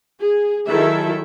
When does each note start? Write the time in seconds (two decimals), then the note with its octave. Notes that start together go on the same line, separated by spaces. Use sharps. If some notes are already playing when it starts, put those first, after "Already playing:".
0.20 G#4
0.66 D#3 F#3 E4 G#4 A4 E5